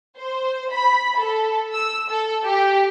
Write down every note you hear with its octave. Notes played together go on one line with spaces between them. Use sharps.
C5
B5
A4
E6
A4
G4